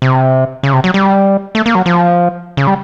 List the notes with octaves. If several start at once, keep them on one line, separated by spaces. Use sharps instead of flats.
C3
C#3
C3
F#3
G3
A3
A#3
F#3
F3
C#3
G3